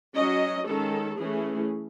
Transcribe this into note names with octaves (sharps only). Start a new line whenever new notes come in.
F#3 C#4 D#5
D#3 G#3 C#4 A4
E3 A3 C#4 G#4